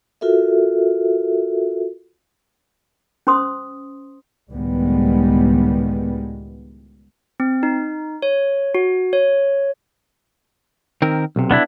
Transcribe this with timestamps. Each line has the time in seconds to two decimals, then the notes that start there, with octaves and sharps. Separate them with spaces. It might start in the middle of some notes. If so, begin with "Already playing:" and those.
0.21 F4 F#4 A4 A#4 E5
3.27 C#4 C5 C6 D#6
4.51 C#2 A2 D#3 G3 G#3 B3
7.40 C4
7.63 D#4
8.22 C#5
8.75 F#4
9.13 C#5
11.02 D#3 C4 A#4
11.36 B1 C3
11.51 B3 D4 E4